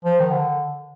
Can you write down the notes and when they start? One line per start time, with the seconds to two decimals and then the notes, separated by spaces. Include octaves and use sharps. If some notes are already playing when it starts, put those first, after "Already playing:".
0.05 F3
0.20 D#3
0.31 D3